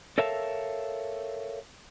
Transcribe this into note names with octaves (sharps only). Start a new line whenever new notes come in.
A4 A#4 C#5 E5 F5 A5